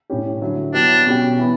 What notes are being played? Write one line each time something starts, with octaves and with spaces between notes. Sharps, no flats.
A2 G3 C#4 G4
D3 F#3 A3 E4
F#3 B3 D4 E4 G4
B2 G3 C#4 G4
E3 B3